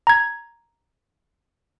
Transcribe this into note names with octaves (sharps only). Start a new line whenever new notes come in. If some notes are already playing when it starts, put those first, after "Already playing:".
A#5 G#6